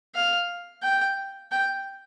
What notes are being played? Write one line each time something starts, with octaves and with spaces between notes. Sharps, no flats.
F5
G5
G5